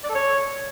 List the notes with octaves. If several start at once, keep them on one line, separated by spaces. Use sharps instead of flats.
D5
A4
C#5